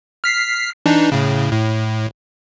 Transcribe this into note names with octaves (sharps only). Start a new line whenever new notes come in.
F6 B6 C7
E3 D4 D#4
A2 C#3
A2